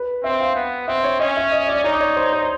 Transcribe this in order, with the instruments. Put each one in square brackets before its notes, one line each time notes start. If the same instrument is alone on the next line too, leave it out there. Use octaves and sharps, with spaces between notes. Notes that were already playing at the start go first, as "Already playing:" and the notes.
Already playing: [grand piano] B4
[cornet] C4 [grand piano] E5
[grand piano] F5
[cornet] B3
[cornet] C4 [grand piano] E5
[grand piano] C#5
[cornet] C#4 [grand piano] D#5
[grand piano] E5
D#5
D5
[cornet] D#4 [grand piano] C#5
[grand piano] D5
C#5
C5
C#5
C5